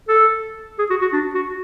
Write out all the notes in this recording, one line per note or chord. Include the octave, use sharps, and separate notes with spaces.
A4
G#4
F#4
F#4
D4
F#4